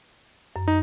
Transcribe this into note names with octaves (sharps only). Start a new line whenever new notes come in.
F#2
D#4